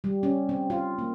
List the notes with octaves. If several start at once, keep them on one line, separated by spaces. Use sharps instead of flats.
G3
C#4
C4
F4
A#3